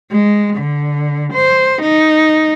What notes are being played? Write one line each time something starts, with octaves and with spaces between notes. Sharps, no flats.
G#3
D3
C5
D#4